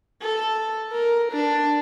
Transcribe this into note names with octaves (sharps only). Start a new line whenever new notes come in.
A4
A#4
D4